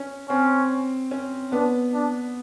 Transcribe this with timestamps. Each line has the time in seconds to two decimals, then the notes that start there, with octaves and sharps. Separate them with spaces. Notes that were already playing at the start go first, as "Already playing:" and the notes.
Already playing: C#4
0.29 C4 C#4
1.11 C#4
1.52 B3 D4
1.93 D4